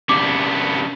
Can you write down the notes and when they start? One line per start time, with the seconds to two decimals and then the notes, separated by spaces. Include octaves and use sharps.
0.09 C2 B3 C#4 D4 G4 D6